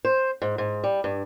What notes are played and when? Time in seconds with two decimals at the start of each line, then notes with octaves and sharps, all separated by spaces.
0.05 C5
0.42 G#2
0.58 G#2
0.84 G3
1.04 G2